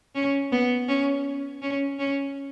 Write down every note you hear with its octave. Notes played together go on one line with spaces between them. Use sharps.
C#4
B3
C#4
C#4
C#4